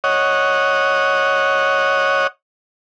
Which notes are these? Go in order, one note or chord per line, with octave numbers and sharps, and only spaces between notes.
C#5 D#5 F#5